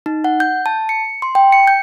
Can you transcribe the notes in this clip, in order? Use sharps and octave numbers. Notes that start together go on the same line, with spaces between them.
D#4
F#5
G6
A5
C#7
C6
G5
C#7
G6